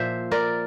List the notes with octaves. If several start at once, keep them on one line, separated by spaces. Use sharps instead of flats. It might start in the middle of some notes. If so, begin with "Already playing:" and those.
Already playing: A#2 F3 C5 E5
A#4 D5